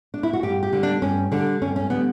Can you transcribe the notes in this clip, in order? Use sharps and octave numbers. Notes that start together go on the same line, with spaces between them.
D4
E4
F#4
G2 G4
G4
D3 G3
D4
G2 C#4
D3 G3 D4
G2 C#4
C#4
D3 G3 B3